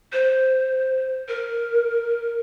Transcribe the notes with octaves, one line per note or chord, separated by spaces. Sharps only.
C5
A#4